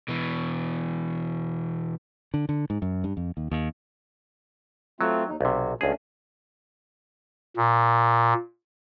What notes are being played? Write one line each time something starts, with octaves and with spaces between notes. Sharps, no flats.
B2 E3
D3
D3
G#2
F#2
G2
F2
D#2
D#2
F#3 A3 C4 F4
D#2 D#4
B1 C3 F#4
C#2 A3 C#4 D4 G#4
A#2